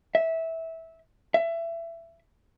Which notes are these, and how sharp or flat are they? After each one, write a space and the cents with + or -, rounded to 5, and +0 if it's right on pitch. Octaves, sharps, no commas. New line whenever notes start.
E5 -15
E5 +20